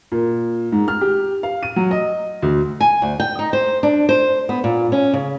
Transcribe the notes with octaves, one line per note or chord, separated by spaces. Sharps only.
A#2
G#2
F6
G4
F5
D#7
F#3
D#5
D2
G#5
D2
G5
D#4
C5
D4
C5
B3
A#2
C#4
C#3